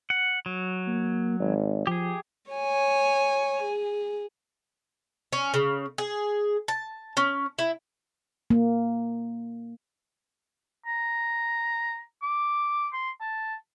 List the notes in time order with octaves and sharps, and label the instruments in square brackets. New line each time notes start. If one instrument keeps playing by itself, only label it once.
[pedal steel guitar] F#5
F#3
[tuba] A#3
G#1
[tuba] F3 [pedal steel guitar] G4 G#4
[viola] C#5 G#5
G#4
[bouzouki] C#4
C#3
G#4
A5
C#4
E4
[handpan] A#3
[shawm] A#5
D6
C6
A5